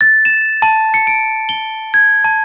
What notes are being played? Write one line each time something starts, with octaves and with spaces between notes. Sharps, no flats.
A6
E7
A5
C#7
D7
G7
G#6
A5